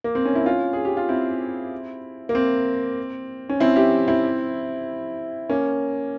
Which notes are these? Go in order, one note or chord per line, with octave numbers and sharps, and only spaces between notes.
A#3
C4
C#4
E4
C#4 F4
G#4
G4
F4
C4 E4
A#3
C4
C#4
C4 E4
E4 G4
C4 E4
A#3 C#4